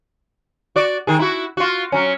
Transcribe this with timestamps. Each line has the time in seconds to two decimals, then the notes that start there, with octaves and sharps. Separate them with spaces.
0.76 F#4 D5
1.07 D#3 G#4
1.19 E4 F#4
1.57 F4 F#4
1.92 F#3 C#4